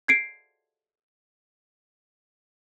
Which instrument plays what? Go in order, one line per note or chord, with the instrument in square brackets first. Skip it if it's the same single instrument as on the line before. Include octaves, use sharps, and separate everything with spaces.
[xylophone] G#6 C7 D7